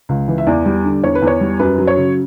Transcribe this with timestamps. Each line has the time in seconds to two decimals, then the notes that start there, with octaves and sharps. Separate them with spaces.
0.09 C#2
0.28 E3
0.38 E5
0.47 E2 D5
0.66 G3
0.85 D3
1.03 E2 C#5
1.15 B4
1.22 E2
1.27 C#5
1.41 G3
1.59 F#2 B4
1.78 F#3
1.87 C#5
1.97 C#3